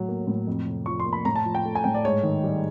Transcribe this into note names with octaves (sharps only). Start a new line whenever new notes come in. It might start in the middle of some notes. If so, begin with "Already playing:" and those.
Already playing: A2 F#3
A#3
A2
F2
C3
F3 C#6
C6
A#3
B5
A2 A#5
A5
F3
G5
A3
G#5
A2 G5
D5
G#2 C#5
D#3
G3